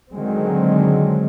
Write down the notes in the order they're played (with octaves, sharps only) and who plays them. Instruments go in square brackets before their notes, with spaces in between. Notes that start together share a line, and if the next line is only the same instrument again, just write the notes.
[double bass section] D3 D#3 F#3 G#3 C4